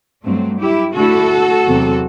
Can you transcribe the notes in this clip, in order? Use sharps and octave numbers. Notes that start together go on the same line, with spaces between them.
G2 F#3 A3 C4
E4 G4
D3 A3 E4 F#4 A4
E2 C3 F#3 C4